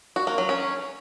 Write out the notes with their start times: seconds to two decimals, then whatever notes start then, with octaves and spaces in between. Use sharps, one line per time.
0.16 F#4
0.27 A#3
0.38 F#3
0.49 C#4